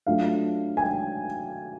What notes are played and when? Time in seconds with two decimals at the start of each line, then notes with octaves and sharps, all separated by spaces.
0.07 F#3 A3 D4 F4 F5
0.77 G#5
0.81 G5